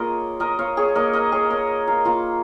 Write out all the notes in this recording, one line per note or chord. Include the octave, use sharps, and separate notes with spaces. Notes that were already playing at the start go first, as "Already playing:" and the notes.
Already playing: A#3 F4 G#4 A#4 C#5 D#5
A#4 D#5
C#5 F5
G#4 C#5
A#3 D#4 A#4 D#5
A#4 D#5
G#4 C#5
A#4 D#5
F5 A#5
A#3 F4 F5 A#5